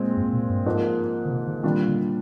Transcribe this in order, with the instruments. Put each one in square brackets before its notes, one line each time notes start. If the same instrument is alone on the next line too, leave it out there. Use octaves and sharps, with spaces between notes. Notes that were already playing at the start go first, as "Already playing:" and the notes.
Already playing: [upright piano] A#2 G#3 C4
[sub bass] G2
A#2
G2
[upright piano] G#2 F3 A#3 D#4
[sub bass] D3
C3
D3
[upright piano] A#2 G3 D4 F4 [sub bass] D#3
[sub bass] D3